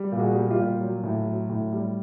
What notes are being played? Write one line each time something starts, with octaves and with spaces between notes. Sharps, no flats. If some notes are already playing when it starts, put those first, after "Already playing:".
Already playing: G3
A#2
F#4 G#4
G3
F4 G4
A#2
F#3
A2
F#3
A2
G3